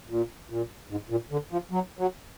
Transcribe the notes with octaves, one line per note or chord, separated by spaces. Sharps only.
A#2
A#2
G#2
A#2
D3
F3
F#3
F#3